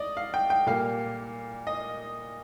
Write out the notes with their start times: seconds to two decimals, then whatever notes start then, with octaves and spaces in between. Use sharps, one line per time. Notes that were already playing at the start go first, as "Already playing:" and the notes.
Already playing: D5 D#5
0.17 F5
0.34 G5
0.50 G5
0.66 A#2 G3 A#3 F5
1.67 D#5